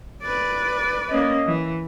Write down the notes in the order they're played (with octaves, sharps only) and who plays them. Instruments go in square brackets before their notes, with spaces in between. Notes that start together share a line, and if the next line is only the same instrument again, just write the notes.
[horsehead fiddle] B4 D5
[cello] A#3 C#4 [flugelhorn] D#5
[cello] E3